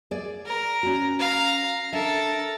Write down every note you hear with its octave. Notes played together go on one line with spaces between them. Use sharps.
G#4 D5
A#4
C#4 F#4
F5 A#5
D4 A4 A#4 E5